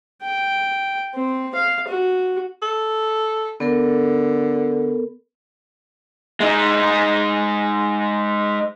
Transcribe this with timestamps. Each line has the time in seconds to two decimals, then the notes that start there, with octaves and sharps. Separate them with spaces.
0.22 G5
1.15 C4
1.55 F5
1.88 F#4
2.62 A4
3.60 D3 B3 A4 A#4
6.40 G#3 D#4